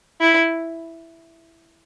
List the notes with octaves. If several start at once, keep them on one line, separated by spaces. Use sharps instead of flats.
E4